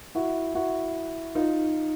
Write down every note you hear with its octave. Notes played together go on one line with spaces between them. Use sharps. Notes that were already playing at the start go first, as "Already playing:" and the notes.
E4 F#4
E4 F#4
D#4 F4